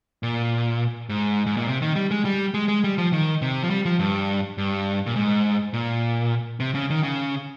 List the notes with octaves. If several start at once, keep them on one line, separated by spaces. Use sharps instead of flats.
A#2
G#2
G#2
A#2
C3
D#3
G3
G#3
G3
G#3
G#3
G3
F3
D#3
C3
F3
G3
F3
G2
G2
A#2
G#2
A#2
C3
C#3
D#3
C#3